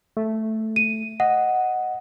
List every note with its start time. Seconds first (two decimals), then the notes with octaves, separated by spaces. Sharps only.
0.17 A3
0.76 D#7
1.20 D#5 F#5